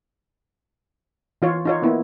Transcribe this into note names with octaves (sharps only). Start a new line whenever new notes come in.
E3 F4 C#5
D#4 F4 C#5
A#3 B3 E4